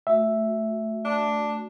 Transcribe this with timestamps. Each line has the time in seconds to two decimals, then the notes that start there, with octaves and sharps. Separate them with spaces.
0.07 A3 F#4 E5
1.05 D4